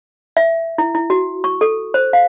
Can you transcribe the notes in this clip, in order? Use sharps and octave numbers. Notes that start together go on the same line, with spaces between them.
E5
E4
E4
F#4
C#6
A4
C5
F5